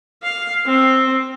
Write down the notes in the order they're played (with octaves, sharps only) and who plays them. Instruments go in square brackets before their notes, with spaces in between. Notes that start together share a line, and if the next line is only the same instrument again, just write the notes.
[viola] F5
C4